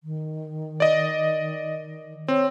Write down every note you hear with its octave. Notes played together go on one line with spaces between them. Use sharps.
D#3
D5 D#5
C4 C#5